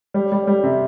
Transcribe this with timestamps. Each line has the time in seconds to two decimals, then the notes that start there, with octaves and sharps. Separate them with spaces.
0.14 G3
0.32 G3
0.47 G3
0.64 C3